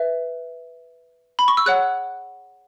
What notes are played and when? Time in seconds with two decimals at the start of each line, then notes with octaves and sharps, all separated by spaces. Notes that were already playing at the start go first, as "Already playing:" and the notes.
Already playing: B4 E5
1.39 B5
1.48 C#6
1.57 E6
1.66 G#4 C#5 F#5 F#6